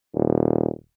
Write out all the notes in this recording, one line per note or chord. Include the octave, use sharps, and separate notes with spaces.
D#1